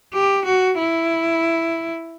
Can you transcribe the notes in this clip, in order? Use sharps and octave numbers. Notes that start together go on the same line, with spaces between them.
G4
F#4
E4